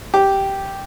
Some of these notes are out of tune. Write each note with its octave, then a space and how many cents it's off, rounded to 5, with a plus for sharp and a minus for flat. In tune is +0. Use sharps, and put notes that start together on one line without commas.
G4 -5